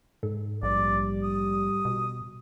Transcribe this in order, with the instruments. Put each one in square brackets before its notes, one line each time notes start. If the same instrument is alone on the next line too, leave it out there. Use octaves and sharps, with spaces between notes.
[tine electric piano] G#2 [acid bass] A4
[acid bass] A#1 [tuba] G3 [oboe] D5
[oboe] D#6
[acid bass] B2